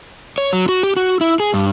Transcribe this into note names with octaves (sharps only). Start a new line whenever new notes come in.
C#5
F#3
F#4
G4
F#4
E4
G#4
G2